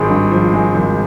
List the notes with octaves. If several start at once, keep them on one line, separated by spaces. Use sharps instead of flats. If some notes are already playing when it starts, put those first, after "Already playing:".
Already playing: G#1 G#3
G2
F3
G#3
G#1